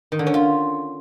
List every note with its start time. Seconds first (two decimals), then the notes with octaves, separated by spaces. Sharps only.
0.12 D#3
0.19 D3
0.27 C#4
0.34 F4